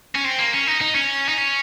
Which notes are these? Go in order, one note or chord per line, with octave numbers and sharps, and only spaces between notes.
C#4
C4
A#3
C#4
D#4
D#4
C#4
D#4
C#4